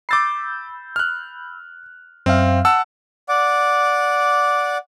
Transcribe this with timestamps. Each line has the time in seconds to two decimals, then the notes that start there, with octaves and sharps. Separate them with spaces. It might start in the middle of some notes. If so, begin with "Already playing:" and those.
0.09 B5 D6 E6 G6 A6 C7
0.96 F6 F#6
2.26 F#2 C4 E5 F5
2.65 F#5 A5 E6
3.29 D5 F#5 D6